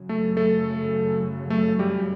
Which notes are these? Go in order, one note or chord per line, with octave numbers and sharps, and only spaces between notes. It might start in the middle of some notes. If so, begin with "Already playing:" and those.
Already playing: F#2 C#3 F#3
A3 A4
A3 A4
A3 A4
G3 G4